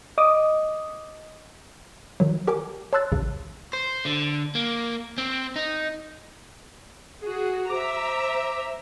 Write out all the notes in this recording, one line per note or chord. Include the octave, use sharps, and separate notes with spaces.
D#5 D6 D#6
D#3 F#3
G4 A#4 G#5 D6
C#5 A5 C6 E6 F#6 A6
A1 D2 C#3
C5
D3
A#3
C4
D#4
F#4 G#4
C5 E5 A#5 D6